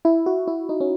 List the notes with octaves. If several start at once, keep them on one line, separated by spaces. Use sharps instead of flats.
E4
F#4
E4
D#4
C#4